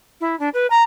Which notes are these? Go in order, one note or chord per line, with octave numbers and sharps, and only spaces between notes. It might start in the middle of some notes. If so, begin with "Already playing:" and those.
E4
D4
B4
A#5